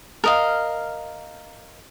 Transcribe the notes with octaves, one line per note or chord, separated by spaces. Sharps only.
A#4 D#5 F5